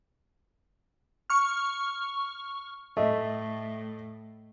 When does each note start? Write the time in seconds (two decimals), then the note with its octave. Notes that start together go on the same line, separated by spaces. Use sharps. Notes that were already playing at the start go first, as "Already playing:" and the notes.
1.30 C#6 F6
2.97 A2 A3 D#5